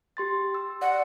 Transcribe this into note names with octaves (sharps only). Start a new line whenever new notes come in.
G4 C6 A6
E6
D5 F#5